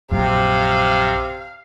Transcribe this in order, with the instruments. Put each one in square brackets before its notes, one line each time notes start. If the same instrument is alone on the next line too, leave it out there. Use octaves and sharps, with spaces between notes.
[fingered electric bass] A#1 F#2 [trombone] C3 [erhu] F5